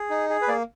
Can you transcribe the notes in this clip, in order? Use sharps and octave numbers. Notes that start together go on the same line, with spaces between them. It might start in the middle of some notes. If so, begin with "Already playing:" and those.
Already playing: G#4
D#4
G#4
B4
A#3 D5